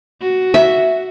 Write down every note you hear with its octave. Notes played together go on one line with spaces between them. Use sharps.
F#4
E5